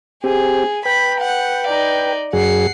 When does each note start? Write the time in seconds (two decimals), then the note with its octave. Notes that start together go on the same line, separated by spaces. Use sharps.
0.24 C4 G4 G#4
0.86 B4 G5 B5
1.20 F#5
1.67 D#4 D5
2.33 F#2 G#4 F#5 C7